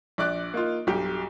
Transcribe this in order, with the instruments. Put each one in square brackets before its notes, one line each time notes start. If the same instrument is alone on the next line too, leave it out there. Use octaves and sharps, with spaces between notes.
[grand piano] A#1 D5 D6 F#6
A#3 D#4 F4
B1 G2 G4